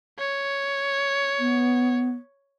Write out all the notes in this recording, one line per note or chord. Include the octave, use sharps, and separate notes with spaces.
C#5
B3